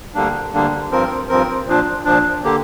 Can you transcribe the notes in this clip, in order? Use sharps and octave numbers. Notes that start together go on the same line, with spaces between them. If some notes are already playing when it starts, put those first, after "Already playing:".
D2 D3 G3 A#3 D4
D2 D3 G3 A#3 D4
G2 F3 C4 A#4
G2 F3 C4 A#4
A#2 F3 D4
A#2 F3 D4
D3 A#3 G4